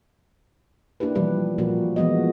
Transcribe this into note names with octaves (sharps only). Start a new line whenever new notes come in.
A#3 D4 E4 G4 B4
B2 E3 F3 G3 G4 B4
A#2 F3 A#3 F#4
E3 F3 G#3 B3 F#4 D#5